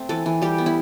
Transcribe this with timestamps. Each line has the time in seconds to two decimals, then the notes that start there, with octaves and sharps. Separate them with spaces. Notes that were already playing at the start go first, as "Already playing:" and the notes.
Already playing: A3 C4
0.09 E3 A4
0.26 E3
0.42 G3 G4
0.58 B3
0.66 E4